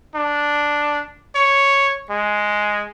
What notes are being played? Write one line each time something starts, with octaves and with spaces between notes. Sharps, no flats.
D4
C#5
G#3